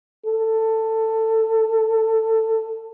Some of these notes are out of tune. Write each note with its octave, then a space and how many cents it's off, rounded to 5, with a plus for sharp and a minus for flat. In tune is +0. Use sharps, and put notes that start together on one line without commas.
A4 +15